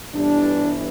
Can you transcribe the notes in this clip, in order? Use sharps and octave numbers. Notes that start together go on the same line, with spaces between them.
G1 G2 E3 D4